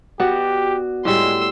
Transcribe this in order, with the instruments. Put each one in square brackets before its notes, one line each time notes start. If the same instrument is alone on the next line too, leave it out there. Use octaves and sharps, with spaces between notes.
[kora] B3 [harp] F#4 D5 F#5 [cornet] G4
[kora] A2 G3 [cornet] G#3 [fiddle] C6 E6